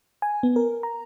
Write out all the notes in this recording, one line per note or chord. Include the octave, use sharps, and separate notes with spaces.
G#5
B3
A#4
A#5